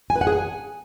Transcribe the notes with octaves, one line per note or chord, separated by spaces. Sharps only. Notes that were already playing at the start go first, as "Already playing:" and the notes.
G#5
B4
F#5
G#4
G#5